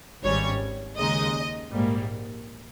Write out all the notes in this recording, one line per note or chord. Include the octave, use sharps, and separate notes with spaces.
G#1 G#2 G3 C#4 C#5
D#2 C#3 G#3 D#4 D#5
A#1 G#2 G3 A#3